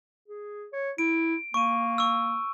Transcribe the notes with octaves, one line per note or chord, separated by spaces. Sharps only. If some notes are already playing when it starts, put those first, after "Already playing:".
G#4
C#5
E4 D7
A#3 C#6 D#7
C#6 E6